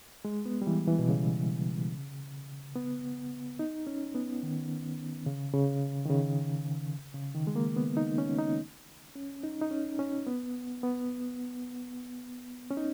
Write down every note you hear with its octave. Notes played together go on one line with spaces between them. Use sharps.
G#3
B3
G3
E3
E3
B2
C#3
B3
D#4
C#4
B3
D#3
C#3
C#3
D#3
C#3
C#3
D#3
G#3
A#3
B3
D#4
C#4
D#4
C#4
D#4
D#4
C#4
C#4
B3
B3
C#4
D#4